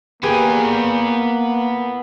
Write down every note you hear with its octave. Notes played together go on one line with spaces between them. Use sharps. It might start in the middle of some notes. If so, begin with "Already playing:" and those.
A#3 B3 G4 G#4 B4 G#5